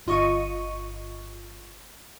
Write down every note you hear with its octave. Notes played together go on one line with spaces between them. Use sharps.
G1 F4 D#5 C#6 D#7